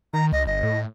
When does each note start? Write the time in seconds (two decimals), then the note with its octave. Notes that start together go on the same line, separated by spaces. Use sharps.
0.13 D#3 A#5
0.32 C#2 D#5
0.47 G1 D#5
0.63 A2